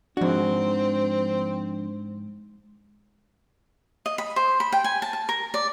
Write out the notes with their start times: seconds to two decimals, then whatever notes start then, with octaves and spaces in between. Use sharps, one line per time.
0.17 G#2 F3 C4 D4 F#4
4.06 D#5
4.18 B5
4.36 C5
4.60 B5
4.72 G5
4.84 G#5
5.02 A5
5.13 A5
5.29 A#4
5.54 D5